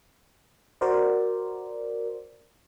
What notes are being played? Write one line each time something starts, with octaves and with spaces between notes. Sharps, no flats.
F#4 A#4 C5 D5